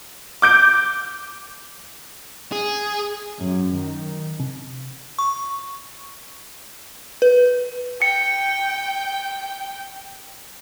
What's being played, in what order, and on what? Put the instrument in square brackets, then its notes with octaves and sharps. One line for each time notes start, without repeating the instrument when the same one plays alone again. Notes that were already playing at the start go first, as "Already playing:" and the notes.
[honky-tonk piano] D6 G6 D7
[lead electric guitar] G#4
[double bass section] F#2
D#3
[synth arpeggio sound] C3
[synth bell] C#6
B4
[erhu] G5 [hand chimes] C#7